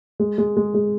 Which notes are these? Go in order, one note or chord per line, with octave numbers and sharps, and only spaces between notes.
G#3
G#3
G#3
G#3